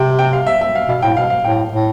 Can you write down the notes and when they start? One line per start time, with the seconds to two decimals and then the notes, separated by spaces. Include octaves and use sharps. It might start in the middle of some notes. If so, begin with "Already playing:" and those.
Already playing: C3 G5
0.19 G5
0.33 F5
0.47 E5
0.61 E5
0.75 F5
0.89 B2 F5
1.02 A2 G5
1.17 B2 F5
1.30 F5
1.44 A2 G5
1.72 A2